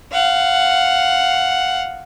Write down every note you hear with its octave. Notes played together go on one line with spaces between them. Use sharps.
F5 F#5